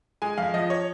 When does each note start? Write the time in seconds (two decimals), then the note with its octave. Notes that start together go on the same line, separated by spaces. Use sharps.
0.22 G#3 G#5
0.38 F2 F5
0.54 F3 D#5
0.70 C#5